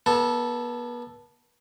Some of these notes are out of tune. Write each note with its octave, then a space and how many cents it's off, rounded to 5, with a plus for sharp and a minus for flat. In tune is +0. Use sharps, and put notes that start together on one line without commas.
B3 -35 A4 +0